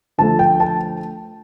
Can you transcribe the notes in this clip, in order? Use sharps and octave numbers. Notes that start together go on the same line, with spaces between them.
D3 F3 A3 A5
G5
A5